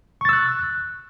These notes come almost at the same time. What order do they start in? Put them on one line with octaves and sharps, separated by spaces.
C#6 A6 E6 F#6